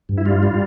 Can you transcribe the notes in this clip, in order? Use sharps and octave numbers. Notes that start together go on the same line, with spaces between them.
G2
E4
G3 F4
G3